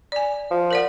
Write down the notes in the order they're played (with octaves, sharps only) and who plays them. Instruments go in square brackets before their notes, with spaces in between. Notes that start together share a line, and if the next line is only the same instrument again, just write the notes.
[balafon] D5 G#5
[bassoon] F3
[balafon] A#4 D5 F#5